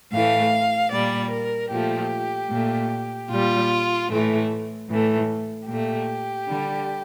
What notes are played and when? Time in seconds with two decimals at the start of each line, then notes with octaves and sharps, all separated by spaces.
0.12 A2 E3 A3 F5
0.92 A#2 G3 D5
1.32 A#4
1.71 A#2 F3 A3 G4
2.51 A#2 A3
3.31 A#2 G3 F4
4.10 A2 E3 A3
4.90 A2 E3 A3
5.69 A#2 A3 G4
6.49 D3 G3